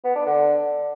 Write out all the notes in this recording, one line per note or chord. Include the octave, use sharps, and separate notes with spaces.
B3
D4
D3